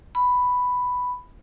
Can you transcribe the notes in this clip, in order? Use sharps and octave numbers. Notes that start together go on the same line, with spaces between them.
B5